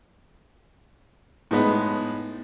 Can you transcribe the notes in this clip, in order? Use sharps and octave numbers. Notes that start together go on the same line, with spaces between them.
A2 G#3 B3 D#4